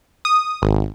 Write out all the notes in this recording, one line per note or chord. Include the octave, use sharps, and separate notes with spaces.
D#6
G#1